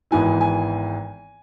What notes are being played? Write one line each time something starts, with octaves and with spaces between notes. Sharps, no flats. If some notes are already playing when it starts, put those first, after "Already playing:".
G#1 G#2 E3 B3 E4 G#5
G#5